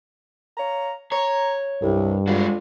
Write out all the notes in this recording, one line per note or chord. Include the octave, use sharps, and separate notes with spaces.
C#5 F5 A#5
C#5 A#5
C2 G2
F2 G#3 D4 F4 F#4